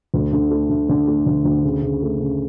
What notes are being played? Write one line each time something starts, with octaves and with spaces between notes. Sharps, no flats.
D2
D3
A3
D3
D3
A3
D2
D2
C#3
C#3
A3
C#3